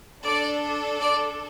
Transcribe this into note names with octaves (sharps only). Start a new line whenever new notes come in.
D4 A4 D5
D5